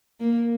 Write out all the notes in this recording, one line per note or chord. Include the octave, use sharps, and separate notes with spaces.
A#3